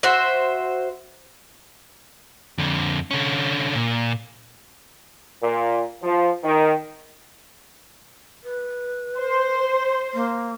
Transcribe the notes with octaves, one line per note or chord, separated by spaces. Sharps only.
F#4 C5 E5
F2 D3
D3 C#4
A#2
A#2
F3
D#3
B4
C5
A#3